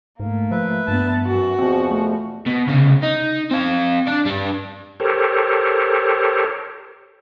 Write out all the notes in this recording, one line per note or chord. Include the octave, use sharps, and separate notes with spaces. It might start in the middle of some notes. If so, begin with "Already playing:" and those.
G#2 A3 A#3
F3 B4 E5
G2 B3 A5
F#2 E3 F#4
E2 B2 F3 C4
A3
B2
C2 C#3
D#4
C4 F5
D4 D5
G3 D4
G4 A4 A#4 C5 C#5